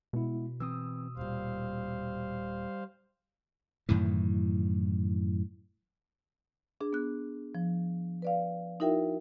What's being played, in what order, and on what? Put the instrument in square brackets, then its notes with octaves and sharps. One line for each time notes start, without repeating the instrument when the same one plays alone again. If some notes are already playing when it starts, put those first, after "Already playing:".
[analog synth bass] B2 [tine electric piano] G#3 B3 E4
[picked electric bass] E3 C4 [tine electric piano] D#6 E6
[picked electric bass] D#1 A#2 [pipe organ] G3 C5 F5
[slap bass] F#2 A2 D#3 E3
[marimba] D4 G#4
B3 F#6
F3
B4 D5 F5
D#4 E4 F#4 A#4 E5 G5